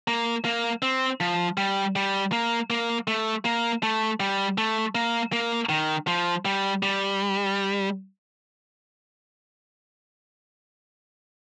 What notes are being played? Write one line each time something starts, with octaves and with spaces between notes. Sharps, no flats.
A#3
A#3
C4
F3
G3
G3
A#3
A#3
A3
A#3
A3
G3
A3
A#3
A#3
D#3
F3
G3
G3